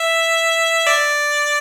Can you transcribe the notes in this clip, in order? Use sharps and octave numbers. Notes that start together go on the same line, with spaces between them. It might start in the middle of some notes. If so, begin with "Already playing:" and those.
Already playing: E5
D5